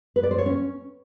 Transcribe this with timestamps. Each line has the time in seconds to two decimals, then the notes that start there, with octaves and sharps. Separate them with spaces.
0.16 B4
0.23 D5
0.31 C5
0.38 C#5
0.46 C#4